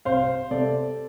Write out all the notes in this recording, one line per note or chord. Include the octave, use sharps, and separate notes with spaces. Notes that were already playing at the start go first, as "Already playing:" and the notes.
C2 C5 F5
C3 A4 D5